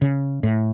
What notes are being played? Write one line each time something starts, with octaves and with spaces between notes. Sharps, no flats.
C#3
A2